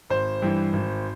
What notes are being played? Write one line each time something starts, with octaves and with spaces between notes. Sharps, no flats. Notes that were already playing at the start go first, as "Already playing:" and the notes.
G#1 C5
G2 E3
G#1